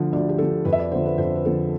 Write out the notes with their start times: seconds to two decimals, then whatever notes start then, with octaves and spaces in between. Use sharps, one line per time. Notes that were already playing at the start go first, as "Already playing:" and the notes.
Already playing: D2 D3 F3
0.13 D2 D5
0.29 G4
0.38 D3 F3 A4
0.65 F2 B4
0.73 E5
0.79 D5
0.91 D3 F3 C5
1.06 B4
1.18 F2 C5
1.36 B4
1.45 D3 F3 A4